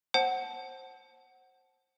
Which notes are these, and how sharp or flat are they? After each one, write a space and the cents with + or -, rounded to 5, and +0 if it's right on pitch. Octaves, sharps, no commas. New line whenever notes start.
C5 +20 F#5 +15 A5 -20